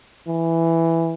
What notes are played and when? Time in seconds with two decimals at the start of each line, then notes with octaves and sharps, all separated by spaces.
0.28 E3